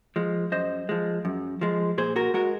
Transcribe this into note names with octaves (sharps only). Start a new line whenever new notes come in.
F3 G#3
F#2 C5 D#5
F3 G#3
F#2
F3 G#3
A#2 G#4 C5
F#4 A#4
G#3 F#4 A#4